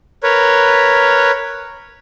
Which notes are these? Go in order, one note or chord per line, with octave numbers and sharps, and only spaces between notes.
A#4 B4 C#5